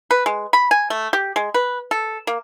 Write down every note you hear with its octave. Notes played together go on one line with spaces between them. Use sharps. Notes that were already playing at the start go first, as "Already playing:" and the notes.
B4
G#3
B5
G#5
A3
G4
G#3
B4
A4
A#3